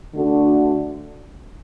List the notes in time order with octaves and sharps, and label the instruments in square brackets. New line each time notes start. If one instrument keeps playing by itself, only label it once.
[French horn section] D3 A3 D4 F#4